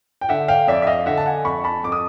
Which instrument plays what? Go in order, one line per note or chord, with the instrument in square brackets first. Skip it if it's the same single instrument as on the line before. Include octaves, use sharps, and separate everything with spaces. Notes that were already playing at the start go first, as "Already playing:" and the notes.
[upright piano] G5
D3 E5 F#5
F5 G5
F2 D5 E5
E5
D#5 F5
D3 E5 F#5
A5
F#5 G#5
F2 B5 C#6
A5 B5
F2 D6
D#6